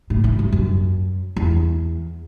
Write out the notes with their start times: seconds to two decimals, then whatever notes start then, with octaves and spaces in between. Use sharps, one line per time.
0.10 A2
0.24 E3
0.39 G2
0.52 F#2
1.36 E2